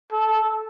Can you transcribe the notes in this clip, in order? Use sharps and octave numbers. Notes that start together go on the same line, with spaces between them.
A4